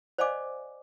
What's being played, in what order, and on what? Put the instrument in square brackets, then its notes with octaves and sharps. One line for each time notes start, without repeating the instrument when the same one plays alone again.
[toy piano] C5 D5 D#5 F5 G#5 D6